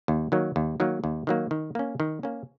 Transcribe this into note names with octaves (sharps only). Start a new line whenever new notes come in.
D#2
D#3 F#3 A#3
D#2
D#3 F#3 A#3
D#2
D#3 F#3 A#3
D#3
A#3 C#4
D#3
A#3 C#4